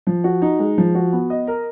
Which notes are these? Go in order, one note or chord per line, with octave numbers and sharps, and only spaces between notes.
F3
F#4
D#4
G#3
F3
F#4
B3
D#5
A#4